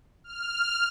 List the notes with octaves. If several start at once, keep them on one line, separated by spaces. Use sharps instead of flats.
F6